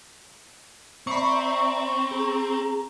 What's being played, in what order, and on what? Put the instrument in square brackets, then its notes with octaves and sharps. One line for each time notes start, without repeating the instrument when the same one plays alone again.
[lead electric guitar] C4 [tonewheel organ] D5 E5 A#5 [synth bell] B5 C#6
[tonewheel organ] G#4 A#5